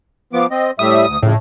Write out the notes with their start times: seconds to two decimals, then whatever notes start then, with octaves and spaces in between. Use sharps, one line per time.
0.33 F3 B3 D6
0.51 C4 D#5
0.79 A2 G3 E5 D#6
1.07 D2
1.22 F2 A2 C#3